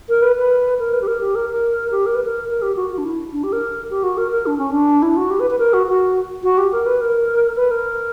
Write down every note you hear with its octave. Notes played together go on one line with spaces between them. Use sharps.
A#4
B4
B4
A#4
B4
G4
A#4
G4
A#4
A#4
G4
A#4
B4
A#4
A#4
G4
F#4
F#4
D4
E4
D4
G4
A#4
G4
F#4
A#4
A#4
D4
C#4
D4
E4
F#4
G4
B4
B4
A#4
F#4
F#4
F#4
G4
A#4
B4
A#4
B4
A#4